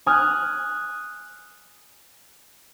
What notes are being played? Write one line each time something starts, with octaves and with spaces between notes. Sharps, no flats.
G#5 D#6 F6 F#6